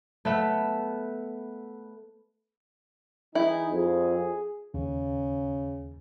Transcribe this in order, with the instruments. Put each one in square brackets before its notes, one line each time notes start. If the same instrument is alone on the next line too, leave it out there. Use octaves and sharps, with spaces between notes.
[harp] A3 B3 E5
[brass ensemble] E3 D#4 G#4 [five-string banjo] E4
[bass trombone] F2 [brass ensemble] G#4
[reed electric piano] D#2 [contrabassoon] C#3